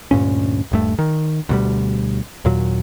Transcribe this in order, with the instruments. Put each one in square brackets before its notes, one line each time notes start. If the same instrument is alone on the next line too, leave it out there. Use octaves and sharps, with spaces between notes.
[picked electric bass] D2 G2 A#2 C#4
D#1 G2 A3
D#3
D2 B2 G3
D#2 A#2 F#3